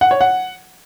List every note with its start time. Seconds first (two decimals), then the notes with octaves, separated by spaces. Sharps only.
0.01 F#5
0.11 C#5
0.21 F#5